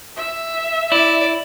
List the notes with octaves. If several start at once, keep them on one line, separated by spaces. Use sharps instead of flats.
E5
E4 D5